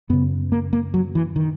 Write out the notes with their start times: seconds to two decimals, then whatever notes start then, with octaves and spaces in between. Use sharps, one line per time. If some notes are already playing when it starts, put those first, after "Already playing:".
0.09 F#2 C#3 B3
0.52 A#3
0.73 A#3
0.94 F#3
1.15 E3
1.36 D#3